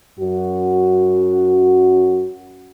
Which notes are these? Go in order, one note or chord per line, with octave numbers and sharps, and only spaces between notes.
F#2 F#4